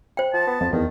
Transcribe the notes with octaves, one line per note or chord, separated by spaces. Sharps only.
C5 G5
F3 A5
B3
F2 F3
E2 D#3